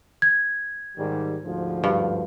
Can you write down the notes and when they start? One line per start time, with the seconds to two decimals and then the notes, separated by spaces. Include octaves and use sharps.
0.22 G#6
0.97 G#2 D#3 G3
1.44 D2 G#2 F3
1.84 G2